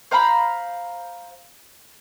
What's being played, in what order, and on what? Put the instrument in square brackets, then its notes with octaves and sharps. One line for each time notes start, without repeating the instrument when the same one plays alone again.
[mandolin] C5 F5 A#5 B5